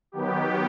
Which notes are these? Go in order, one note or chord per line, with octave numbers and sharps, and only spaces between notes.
D#3 F#3 B3 G4